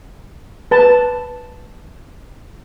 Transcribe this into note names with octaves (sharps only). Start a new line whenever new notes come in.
B4 A5